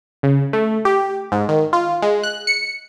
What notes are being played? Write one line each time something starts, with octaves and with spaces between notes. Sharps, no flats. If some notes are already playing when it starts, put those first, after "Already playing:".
C#3
A3
G4
G#2
D#3
F4
G#3
F#6
C#7